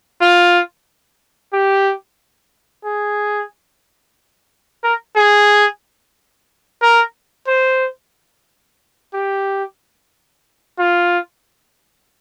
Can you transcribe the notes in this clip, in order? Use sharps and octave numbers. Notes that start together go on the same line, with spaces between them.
F4
G4
G#4
A#4
G#4
A#4
C5
G4
F4